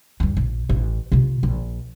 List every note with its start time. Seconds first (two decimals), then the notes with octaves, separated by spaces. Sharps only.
0.20 E2 G2
0.37 A#1
0.69 A1
1.12 C3 F4
1.43 A#1